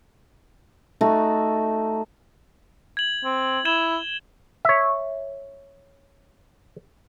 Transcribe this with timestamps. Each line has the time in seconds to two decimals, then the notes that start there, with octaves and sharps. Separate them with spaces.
1.01 A3 D#4 F#4
2.97 G#6 F#7
3.25 C4
3.65 E4 G#6 E7 G7
4.65 C#5 E5